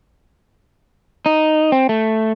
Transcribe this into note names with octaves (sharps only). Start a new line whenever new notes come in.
D#4
C4
A3